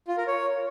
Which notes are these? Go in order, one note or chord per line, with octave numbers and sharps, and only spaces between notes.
F4
A#4
C#5